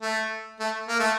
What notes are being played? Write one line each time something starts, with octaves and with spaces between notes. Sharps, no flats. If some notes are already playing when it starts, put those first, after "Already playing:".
A3
A3
A#3
A3